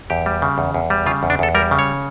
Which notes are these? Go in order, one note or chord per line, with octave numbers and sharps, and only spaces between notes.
E2 G4
G3
C#3
E2
E2
G3
C#3 F4
E2
D4
E2 A4
G3 A#4
C#3
C#5